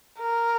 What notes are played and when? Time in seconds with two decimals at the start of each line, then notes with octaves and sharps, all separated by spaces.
0.20 A#4